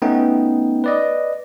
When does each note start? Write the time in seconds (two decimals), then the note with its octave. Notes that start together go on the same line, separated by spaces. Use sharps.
0.02 A3 B3 C#4 D#4 G5
0.84 B4 D5 D#5